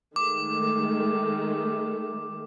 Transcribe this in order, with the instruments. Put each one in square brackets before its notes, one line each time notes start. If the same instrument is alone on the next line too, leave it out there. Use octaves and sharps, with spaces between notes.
[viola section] D#3 G#3 A3 [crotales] D6